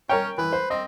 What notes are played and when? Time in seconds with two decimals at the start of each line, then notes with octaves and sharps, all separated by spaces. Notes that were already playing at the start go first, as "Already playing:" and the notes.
0.09 C#4 A#4 C#5 G5
0.38 E3 B4
0.53 C5
0.70 C4 D#5